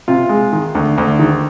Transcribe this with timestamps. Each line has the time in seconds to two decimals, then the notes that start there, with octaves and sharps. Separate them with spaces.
0.08 C3 F4
0.29 G#3
0.53 D#3
0.75 D2
0.98 D2
1.19 D#3